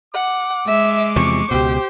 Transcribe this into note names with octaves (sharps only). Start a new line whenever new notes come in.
F#5 D6
G#3 E5
E2 C3 F3 C#6
C#2 B2 G4 C5